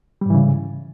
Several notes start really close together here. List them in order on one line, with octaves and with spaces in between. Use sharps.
G3 G#2 E3 C#3